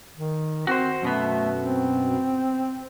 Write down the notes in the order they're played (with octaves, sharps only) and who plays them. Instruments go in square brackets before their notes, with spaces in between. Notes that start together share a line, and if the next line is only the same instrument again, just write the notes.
[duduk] D#3
[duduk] C4 [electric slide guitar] F#4 C5
[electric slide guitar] F#2 B2 B3 [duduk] A3
[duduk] C4